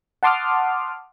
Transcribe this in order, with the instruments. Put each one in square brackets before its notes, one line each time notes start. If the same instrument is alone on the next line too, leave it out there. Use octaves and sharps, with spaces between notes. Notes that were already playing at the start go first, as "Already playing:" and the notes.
[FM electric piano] F#5 A5 C6 D6 D#6 F6